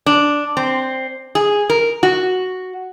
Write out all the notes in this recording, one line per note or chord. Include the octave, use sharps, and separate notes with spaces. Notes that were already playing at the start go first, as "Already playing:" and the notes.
D4
C4
G#4
A#4
F#4